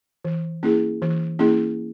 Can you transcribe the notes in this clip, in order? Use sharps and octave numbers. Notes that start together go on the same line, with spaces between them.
E3
A#3 C#4 E4 G#4
E3
A#3 C#4 E4 G#4